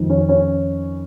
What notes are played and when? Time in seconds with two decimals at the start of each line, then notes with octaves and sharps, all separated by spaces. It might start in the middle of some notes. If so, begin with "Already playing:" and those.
Already playing: F2 D#3
0.10 C#4
0.29 C#4